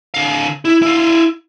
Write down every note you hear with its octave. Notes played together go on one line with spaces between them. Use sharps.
D3 F5
E4
E4 F5